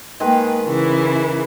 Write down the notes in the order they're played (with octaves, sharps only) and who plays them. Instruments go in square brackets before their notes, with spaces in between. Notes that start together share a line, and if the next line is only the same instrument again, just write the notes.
[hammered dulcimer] D#3 G#3 [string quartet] A#3 B4
[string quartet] C#3 E3 E4